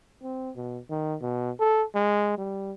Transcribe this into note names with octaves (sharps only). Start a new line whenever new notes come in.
C4
B2
D#3
B2
A4
G#3
G3